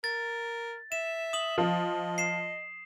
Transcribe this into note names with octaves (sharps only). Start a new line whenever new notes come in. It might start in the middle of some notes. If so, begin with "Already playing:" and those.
A#4 A6
E5 E7
D#6 F#7
F3 D#5
C7 E7